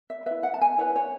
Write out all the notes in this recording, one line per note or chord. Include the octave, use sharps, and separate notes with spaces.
E5
E4 B4 E5
F#5
A5
G#5
E4 B4 C#5
C#5